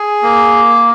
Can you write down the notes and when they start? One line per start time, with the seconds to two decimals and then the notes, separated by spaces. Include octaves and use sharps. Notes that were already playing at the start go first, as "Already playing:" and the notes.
Already playing: G#4
0.23 A#3